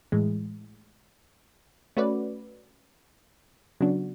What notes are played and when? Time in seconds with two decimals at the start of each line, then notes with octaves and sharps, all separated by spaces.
0.12 A2 E3 G#3
1.97 A3 C#4 F#4 B4 D5
3.80 C#3 F#3 B3 D4 F#4